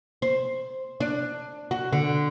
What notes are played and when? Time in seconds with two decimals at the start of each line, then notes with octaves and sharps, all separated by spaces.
0.22 C5
1.00 D4
1.71 F#4
1.92 D3